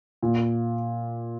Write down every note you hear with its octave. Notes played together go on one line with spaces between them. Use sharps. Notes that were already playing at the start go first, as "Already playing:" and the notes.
A#2